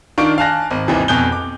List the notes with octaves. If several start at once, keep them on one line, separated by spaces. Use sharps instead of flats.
D#3 D4 F4 C#6 D7
F5 G#5 A5 F#6 A#6
G#1
G#1 D#2 C3 E3
F2 B2 G#5 F#6 G6 G7
D6